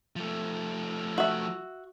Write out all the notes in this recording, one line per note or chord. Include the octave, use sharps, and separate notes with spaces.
F3 A3
F#4 E5